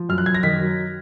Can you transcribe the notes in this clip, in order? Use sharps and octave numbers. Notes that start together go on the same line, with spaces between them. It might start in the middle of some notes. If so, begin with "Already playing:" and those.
Already playing: F3
F#2 F6
F#6
F#2 G#6
A#6
D#3 B6
F#3